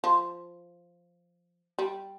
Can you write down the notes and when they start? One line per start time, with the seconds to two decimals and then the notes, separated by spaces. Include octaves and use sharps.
0.04 F3
1.79 G3